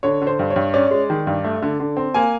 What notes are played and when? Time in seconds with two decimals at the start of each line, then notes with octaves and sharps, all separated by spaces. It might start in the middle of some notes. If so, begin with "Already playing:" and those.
0.03 D3 C#5
0.22 D3
0.27 C5
0.39 G2
0.50 C#5
0.56 G2
0.74 C#4 D5
0.91 G#3
1.10 D#3
1.27 G2
1.44 A3
1.62 D3
1.80 D3
1.97 C4
2.14 A#3 G#5